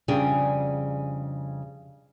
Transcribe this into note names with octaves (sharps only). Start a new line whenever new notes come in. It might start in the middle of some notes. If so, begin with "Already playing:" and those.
F2 C#3 G3 D4 G#4 G5